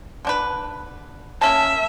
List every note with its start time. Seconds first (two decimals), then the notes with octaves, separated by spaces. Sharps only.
0.25 D3 D4 B4
1.41 A#3 C#4 E5 A5